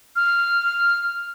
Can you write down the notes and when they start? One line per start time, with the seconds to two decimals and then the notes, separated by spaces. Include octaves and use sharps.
0.16 F6